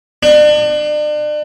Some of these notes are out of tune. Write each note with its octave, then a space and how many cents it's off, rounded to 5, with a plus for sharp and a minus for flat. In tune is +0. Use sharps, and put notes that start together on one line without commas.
D4 +35